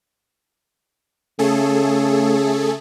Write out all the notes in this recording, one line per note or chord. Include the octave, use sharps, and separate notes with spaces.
C#3 A3 G#4 A4